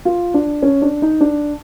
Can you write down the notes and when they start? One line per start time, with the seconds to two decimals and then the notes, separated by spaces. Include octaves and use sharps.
0.05 F4
0.34 D4
0.63 C#4
0.82 D4
1.02 D#4
1.21 D4